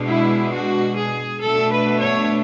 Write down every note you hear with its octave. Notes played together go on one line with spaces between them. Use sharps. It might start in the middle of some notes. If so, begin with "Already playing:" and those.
Already playing: B2 G#3 D4
E4
F#4
G#4
B2 A3 D4 A4
B4
C#5